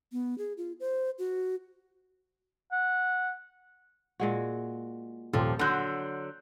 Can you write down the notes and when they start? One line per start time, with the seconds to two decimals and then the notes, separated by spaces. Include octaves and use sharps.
0.13 B3
0.38 G#4
0.57 F4
0.80 C5
1.19 F#4
2.72 F#5
4.20 A#2 G#3 F#4
5.33 D#1 F3 G4 A4
5.59 D3 F#3 C6 F#6 G6